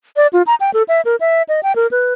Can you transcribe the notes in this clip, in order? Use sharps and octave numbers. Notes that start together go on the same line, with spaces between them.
D5
F4
A#5
G5
A4
E5
A#4
E5
D#5
G5
A#4
B4